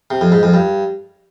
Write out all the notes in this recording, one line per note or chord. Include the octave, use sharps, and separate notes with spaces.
C3
F2
G#2
F2
G2